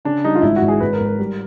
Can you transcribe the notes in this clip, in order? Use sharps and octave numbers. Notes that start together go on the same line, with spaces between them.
C#3 D4
G3 D#4
F4
G#1 E4
F#4
G#1
G#4
G#1 B4
A#4
G#1
A#4
G3